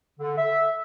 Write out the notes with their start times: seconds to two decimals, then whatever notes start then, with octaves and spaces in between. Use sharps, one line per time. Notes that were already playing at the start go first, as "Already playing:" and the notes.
0.20 D3
0.37 E5